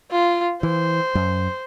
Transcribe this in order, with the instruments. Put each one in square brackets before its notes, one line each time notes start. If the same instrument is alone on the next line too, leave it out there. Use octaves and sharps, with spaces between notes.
[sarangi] F4
[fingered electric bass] E3 [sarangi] C5
[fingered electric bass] F#2